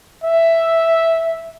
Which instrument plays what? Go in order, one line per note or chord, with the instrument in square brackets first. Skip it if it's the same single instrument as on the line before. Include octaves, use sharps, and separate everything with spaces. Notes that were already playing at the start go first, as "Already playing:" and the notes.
[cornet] E5